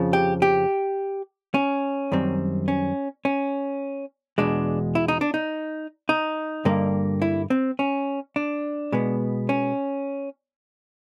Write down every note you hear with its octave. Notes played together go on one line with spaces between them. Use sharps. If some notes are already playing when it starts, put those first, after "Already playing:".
Already playing: F2 C#3 F3
G4
G4
C#4
F#2 D#3 G3 C4
C#4
C#4
E2 B2 G#3 D4
E4
D#4
D4
D#4
D#4
G2 D3 G3 A#3
E4
C4
C#4
D4
B2 G#3 B3
C#4